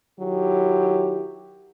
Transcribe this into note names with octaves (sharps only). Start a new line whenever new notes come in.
D#3 F#3 E4 G4